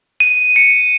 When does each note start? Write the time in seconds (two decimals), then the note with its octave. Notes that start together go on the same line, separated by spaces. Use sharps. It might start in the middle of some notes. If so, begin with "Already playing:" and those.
0.20 D#7
0.56 C#7